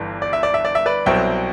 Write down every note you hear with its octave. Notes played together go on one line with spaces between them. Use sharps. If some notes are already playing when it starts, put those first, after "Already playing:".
Already playing: G1 G2 E3
D5
E5
D5
E5
D5
E5
B4 D5
C2 B2 F#3 C4 E5 G5